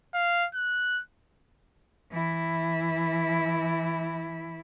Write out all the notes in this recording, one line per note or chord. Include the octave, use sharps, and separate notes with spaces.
F5
F#6
E3 E4